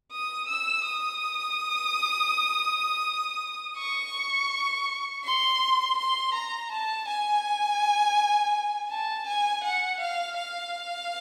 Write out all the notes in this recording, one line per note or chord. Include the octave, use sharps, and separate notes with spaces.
D#6
E6
D#6
C#6
C6
C6
A#5
A5
G#5
A5
G#5
F#5
F5
F5